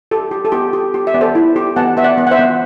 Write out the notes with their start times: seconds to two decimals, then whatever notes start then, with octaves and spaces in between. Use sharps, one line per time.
0.11 G4 A4
0.31 G4
0.45 A4
0.52 B3 G4
0.73 G4
0.94 G4
1.07 E5
1.14 B3 D5
1.21 A4 C5
1.35 E4
1.56 G4
1.76 B3 F#5 A5
1.97 B3 E5
2.04 D5 F#5
2.18 B3
2.27 F#5
2.31 C5 E5
2.39 B3